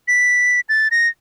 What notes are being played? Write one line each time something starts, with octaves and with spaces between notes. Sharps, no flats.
B6
A6
A#6